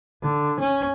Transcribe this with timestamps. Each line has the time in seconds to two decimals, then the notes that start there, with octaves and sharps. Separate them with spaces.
0.22 D3
0.59 C#4